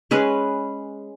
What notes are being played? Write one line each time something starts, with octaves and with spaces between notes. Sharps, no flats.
G#3 C#4 G#4 B4